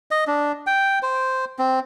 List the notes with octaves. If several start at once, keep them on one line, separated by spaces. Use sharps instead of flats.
D#5
D4
G5
C5
C4